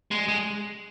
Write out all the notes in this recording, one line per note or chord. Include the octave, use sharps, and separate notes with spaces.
G#3
G#3